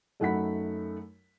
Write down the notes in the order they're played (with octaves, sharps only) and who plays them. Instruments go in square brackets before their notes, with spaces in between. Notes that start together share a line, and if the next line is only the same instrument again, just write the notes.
[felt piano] F#2 A3 D#4 F#5 B5 B6